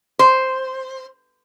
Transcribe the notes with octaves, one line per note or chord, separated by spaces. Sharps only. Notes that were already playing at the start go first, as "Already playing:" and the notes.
C5